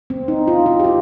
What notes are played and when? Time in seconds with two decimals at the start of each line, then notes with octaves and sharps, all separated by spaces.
0.10 C4
0.28 D#4
0.48 F4
0.66 F4
0.80 G4
0.84 F4